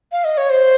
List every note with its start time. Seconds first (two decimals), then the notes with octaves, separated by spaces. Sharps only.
0.12 F5
0.25 D#5
0.38 C#5
0.50 C5